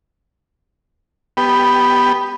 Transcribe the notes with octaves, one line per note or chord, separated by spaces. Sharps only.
B3 G4